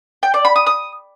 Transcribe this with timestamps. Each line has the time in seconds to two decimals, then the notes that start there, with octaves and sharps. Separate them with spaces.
0.23 G5
0.34 D5
0.45 B5
0.56 D#6
0.67 D#6